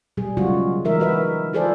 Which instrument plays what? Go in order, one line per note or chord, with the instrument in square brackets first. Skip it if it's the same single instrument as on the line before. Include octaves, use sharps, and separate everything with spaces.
[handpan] B2 G3 G#4
C#3 F#3 G#3 F4 F#4
E3 G#3 D#4 A#4 E5
F#4 B4 E5
E4 F4 G#4 A4 C5 D5